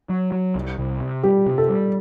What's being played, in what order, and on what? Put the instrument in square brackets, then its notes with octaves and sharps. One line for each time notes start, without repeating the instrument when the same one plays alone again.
[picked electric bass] F#3
F#3
C2
C2
C3
[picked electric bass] G3 [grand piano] G4
[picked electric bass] C3
[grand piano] A4
[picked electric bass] G3